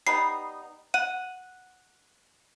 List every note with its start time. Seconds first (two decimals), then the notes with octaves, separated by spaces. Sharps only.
0.07 G3 B3 D#4 C7
0.94 F#5 D#7